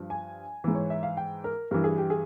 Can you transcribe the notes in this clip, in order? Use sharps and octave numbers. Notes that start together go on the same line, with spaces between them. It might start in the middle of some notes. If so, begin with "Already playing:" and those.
Already playing: G2 F3
G#5
G#2 E3
C#5
E5
F5
G5
A#4
G2 E3 A#4
G#4
G4
G#4